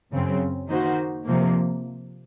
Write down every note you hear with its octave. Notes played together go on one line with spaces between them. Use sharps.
F#2 C#3 F#3 C4
D#3 A#3 D#4 F#4 C5
C3 F3 A#3